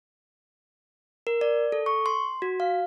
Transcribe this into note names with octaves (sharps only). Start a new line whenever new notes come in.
A#4
D5
A4
C#6
C6
F#4
F5